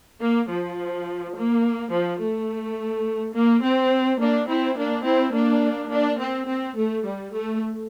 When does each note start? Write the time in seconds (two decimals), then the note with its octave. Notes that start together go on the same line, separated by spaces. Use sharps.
0.21 A#3
0.50 F3
1.36 A#3
1.92 F3
2.21 A3
3.34 A#3
3.63 C4
4.19 A#3 D4
4.48 C4 E4
4.77 A#3 D4
5.05 C4 E4
5.33 A#3 D4
5.90 A#3 D4
6.19 C4
6.47 C4
6.76 A3
7.04 G3
7.32 A3